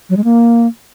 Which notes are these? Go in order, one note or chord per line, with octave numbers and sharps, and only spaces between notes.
F#3
G#3
A#3